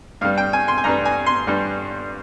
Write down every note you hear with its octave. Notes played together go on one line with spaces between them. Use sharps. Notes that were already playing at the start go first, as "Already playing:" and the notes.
G2 G3 F5
G5
G#5
C6
G#5
G2 G3 A#5
G#5
C6
G2 G3